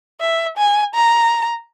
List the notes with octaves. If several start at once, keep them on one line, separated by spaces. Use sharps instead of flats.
E5
G#5
A#5